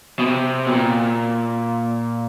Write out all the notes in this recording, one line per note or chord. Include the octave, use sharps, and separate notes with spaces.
B2
C3
B2
A#2